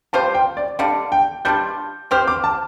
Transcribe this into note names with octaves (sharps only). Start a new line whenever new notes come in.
G3 F4 C5 A5
G5
D5
D3 G3 D4 F5
G5
G3 D4 F4 G6
C4 G4 C5 F6
D6
A5